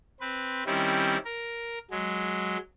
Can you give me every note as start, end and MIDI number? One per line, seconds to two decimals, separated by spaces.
0.20 0.63 60
0.20 0.63 71
0.66 1.17 51
0.66 1.17 55
0.66 1.17 60
0.66 1.17 61
0.66 1.17 64
1.25 1.78 70
1.91 2.57 54
1.91 2.57 56